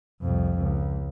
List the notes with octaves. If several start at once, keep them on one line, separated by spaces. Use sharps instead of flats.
C2 F2
C#2